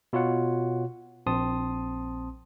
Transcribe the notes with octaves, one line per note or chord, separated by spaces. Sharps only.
B2 F4 C#5 F#5
A#1 C4 A5 C6 D#6